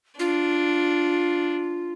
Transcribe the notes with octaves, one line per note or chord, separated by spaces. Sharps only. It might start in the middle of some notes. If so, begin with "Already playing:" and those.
D4 F4